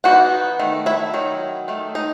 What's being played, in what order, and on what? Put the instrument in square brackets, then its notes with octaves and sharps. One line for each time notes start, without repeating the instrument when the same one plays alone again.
[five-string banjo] E3 B3 D#4 F#4 F#5
D#3 A3
E4 E5
D#3 F#3
D#3 A3
D#4 D#5